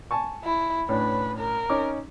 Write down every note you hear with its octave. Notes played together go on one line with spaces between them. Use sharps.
G#5 A5 C#6
E4
A2 C#4 D4 B4
A#4
C#4 D#4 D6